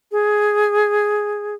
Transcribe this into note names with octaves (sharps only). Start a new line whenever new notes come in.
G#4